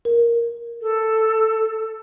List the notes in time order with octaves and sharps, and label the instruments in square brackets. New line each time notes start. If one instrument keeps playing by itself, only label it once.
[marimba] A#4
[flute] A4